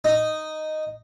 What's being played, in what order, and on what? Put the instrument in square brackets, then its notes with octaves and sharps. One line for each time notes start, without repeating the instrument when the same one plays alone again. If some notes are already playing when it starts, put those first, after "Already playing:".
[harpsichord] D#4